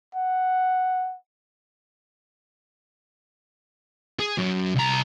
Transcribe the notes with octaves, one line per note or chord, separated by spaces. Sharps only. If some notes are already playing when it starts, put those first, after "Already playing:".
F#5
G#4
F#2
C2 A#5